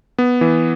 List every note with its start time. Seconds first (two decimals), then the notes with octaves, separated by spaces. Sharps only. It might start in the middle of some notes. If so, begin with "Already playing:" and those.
0.18 B3
0.41 E3